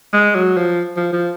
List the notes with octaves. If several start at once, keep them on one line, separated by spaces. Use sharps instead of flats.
G#3
F#3
F3
F3
F3